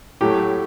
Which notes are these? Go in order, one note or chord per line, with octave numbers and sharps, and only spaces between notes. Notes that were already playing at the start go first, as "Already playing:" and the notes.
A2 F#3 A3 G4